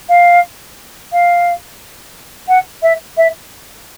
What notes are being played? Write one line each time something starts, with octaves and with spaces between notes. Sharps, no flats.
F5
F5
F#5
E5
E5